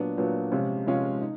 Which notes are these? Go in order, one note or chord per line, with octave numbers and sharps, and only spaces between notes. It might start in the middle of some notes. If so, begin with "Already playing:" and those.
Already playing: A#2 F#3 B3 D4
A#2 F#3 B3 D4
C3 F3 G#3 C#4 F4
C3 F3 G#3 C#4 F4
D#4